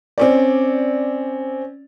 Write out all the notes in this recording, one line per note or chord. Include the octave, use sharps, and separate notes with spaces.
C4 C#4 D5